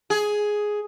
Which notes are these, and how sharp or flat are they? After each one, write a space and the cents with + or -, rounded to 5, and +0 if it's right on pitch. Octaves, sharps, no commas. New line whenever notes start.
G#4 +5